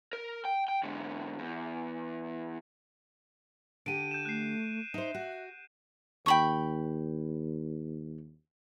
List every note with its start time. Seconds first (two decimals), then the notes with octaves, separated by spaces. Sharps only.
0.13 A#4
0.45 G5
0.68 G5
0.83 G#2 D3
1.39 E2
3.86 D3 G4 D7 D#7
4.11 G6 E7
4.25 A3 F#6 C7
4.94 D#4 C5 E5
5.14 F#4
6.26 D#2 G5 B5 C#6